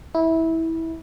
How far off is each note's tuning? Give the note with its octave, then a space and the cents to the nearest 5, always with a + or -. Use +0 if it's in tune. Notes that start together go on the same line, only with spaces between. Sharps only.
E4 -20